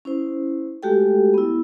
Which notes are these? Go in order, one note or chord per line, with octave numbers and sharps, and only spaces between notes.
C#4 E4 C5
G#3 A3 F#4 G4 A4 G5
B3 E4